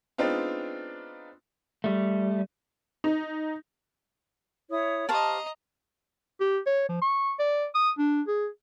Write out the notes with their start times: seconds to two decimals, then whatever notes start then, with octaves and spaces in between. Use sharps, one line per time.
0.18 G#3 B3 C4 D4 D#4 F4
1.84 G3 A3
3.04 D#4
4.70 E4 C#5 D#6
5.09 G4 C5 D#5 F5 A5 A#5 C#6
6.40 G4
6.66 C#5
6.89 F3
7.02 C#6
7.39 D5
7.75 D#6
7.98 D4
8.27 G#4